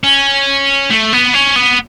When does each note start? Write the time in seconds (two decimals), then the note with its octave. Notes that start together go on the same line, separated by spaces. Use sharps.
0.04 C#4
0.90 A3
1.13 B3
1.34 C#4
1.56 B3